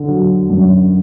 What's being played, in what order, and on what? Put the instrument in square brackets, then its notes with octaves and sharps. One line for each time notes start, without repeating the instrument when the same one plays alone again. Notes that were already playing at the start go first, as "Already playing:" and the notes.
Already playing: [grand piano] D3
F#3
F#2